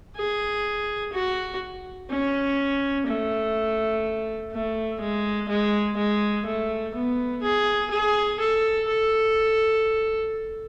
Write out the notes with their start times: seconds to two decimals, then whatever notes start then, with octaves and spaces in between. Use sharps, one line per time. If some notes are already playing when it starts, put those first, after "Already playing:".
0.16 G#4
1.12 F#4
2.10 C#4
3.06 A3
4.52 A3
5.00 G#3
5.48 G#3
5.97 G#3
6.45 A3
6.94 B3
7.42 G#4
7.91 G#4
8.40 A4
8.87 A4